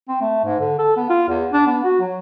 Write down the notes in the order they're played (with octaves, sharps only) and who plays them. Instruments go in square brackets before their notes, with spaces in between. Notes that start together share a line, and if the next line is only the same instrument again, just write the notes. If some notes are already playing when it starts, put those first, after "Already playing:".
[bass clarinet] C4
A3
G#2
D3
A4
B3
F4
E2
D4
B3
F#4
F#3